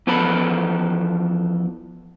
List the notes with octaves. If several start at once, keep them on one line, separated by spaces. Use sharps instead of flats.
E2 F3 B3 A4 C5 B5